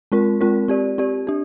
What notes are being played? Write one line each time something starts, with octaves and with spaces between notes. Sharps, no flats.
G#3 C4 F4 A#4
G#3 C4 F4 A#4
C4 G4 D5
C4 G4 D5
D4 G4